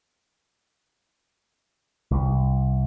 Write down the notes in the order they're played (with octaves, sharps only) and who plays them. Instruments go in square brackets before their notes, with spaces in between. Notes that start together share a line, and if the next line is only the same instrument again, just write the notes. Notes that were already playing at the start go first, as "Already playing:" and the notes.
[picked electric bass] C2